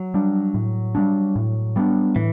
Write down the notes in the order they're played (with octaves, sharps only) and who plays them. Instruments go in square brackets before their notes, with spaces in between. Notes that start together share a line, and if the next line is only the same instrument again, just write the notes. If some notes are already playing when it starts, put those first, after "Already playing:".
Already playing: [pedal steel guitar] F#3
[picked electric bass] G3 D4
A2
G3 B3 D4
A2
G3 B3 D4
[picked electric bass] A2 [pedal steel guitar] E3